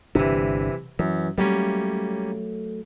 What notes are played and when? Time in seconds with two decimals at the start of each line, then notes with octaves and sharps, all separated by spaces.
0.15 G1 C3 E3 D4
0.99 F#2 E3
1.38 F#3 G3 A3 A#3 C#4